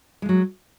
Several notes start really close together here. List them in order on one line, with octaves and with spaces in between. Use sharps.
G#3 F3 F#3